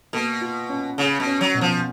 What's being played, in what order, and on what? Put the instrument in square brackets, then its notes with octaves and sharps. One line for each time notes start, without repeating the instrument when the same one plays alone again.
[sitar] B2 [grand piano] A#3
[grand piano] F4
C#4
[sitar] C#3 [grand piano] C#4
[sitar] B2
[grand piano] C#4
[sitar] F#3
[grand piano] B2
[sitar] F3